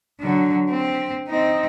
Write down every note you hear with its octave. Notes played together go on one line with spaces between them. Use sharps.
D3 F#3
C4
C4 D#4